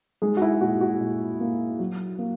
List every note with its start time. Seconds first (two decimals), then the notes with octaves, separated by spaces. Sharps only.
0.22 G#3 D#4 G#4
0.37 F#4
0.42 E4
0.61 A#2 F#4
0.81 F#4
1.00 A#2
1.40 A#3
1.79 F#3
2.19 A#3